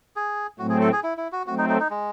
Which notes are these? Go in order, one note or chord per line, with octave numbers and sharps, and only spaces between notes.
G#4
A2 F#3 A3 C4 F#4
G#4
A4
G#4
E4
E4
F#4
F#3 A3 C4 F#4
D#4
D#4
D#4
G#3